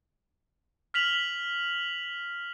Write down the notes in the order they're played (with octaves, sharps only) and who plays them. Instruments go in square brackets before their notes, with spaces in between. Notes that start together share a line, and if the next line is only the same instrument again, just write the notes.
[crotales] F6 B6 F7 F#7